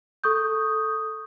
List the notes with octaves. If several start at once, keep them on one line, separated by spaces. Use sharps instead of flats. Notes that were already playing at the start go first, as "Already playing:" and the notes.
A4 C#6 D#6 G6